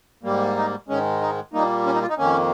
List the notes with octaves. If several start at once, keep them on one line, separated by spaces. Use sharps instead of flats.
G#2 G3 A#3
D#4
G#2 D#3 G#3 C#4
D#4
A#2 G3 A#3 D#4
C#4
D#4
F4
D#4
F2 D#3 A#3 C#4